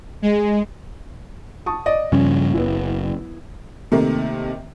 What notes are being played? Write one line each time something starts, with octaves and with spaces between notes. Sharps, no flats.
G#3
A5 C#6 D#6
D5 D#5
G2 C#3 F3 C#4
F#1 B3 E4
C3 D#3 A3 A#3